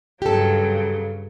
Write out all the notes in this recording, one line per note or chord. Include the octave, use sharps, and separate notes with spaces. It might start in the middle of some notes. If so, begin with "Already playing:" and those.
G2 C#3 F#3 G4 A4